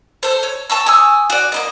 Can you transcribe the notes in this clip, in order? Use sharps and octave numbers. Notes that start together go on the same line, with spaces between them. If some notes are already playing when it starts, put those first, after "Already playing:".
A4 C5
C#5
A5 C#6 E6
G#5 C#6 D#6 E6
F#4 D5
A#3 B3 D#5